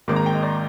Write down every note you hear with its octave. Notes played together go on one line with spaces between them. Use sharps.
G#1 G#2 D#3 A#3 D6
A#5
G5
D#5
D5